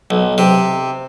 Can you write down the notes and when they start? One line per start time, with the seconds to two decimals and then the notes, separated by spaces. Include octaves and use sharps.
0.10 B1
0.38 C3